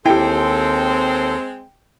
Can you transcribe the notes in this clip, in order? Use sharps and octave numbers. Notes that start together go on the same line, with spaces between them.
D#2 G#3 C4 E4 G4 A4 G5